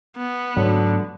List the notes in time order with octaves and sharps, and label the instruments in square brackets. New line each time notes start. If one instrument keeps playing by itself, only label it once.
[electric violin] B3
[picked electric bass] G#2 A3 [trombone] D3 [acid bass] F#3